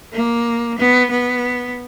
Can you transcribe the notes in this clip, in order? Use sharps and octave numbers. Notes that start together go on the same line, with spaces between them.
A#3
B3
B3